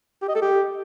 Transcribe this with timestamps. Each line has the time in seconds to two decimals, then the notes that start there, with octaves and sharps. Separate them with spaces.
0.22 G4
0.28 D#5
0.35 A4
0.42 G4